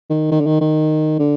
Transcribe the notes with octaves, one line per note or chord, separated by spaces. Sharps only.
D#3
D#3
D3
D#3
D#3
D3